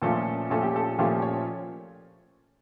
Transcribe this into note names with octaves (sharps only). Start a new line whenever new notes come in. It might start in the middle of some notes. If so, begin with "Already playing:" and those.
A#2 F3 A3 C#4 F4 A4
A#2 F3 A3 C#4 F4 A4
G4
A4
A#2 F3 A3 C#4 F4 G4
C#5